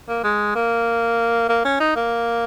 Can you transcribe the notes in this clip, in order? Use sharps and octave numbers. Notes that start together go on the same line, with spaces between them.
A#3
G#3
A#3
A#3
C#4
D#4
A#3